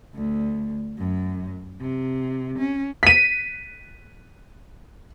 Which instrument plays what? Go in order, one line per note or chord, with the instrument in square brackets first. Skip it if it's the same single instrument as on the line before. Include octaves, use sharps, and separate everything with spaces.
[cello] D2
F#2
C3
C#4
[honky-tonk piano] B6 D#7